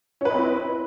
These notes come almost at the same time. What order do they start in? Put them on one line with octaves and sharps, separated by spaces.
C#4 B4 D#5 C4 E4